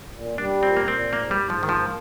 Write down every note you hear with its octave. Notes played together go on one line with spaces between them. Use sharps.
A#2
G3 D4
A#2 C4
A#3
A#2 C4
G#2 A#3
G3
G#2
F3
D#3 A#3
F3